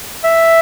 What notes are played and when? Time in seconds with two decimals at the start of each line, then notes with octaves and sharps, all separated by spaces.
0.24 E5